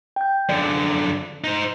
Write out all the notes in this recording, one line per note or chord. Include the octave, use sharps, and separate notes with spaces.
G5 G6
F#2 D3 D5
D#4 C5